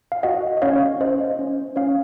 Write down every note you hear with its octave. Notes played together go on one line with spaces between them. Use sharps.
F5
F#4 D#5 F#5
D#5
C#4 C#5 F5
C#4 C5 D#5
C#4
C#4 C#5 F5